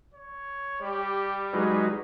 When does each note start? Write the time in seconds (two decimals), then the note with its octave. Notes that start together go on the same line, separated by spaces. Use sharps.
0.14 C#5
0.82 G3 G4
1.53 F#3 G#3 D#4 B4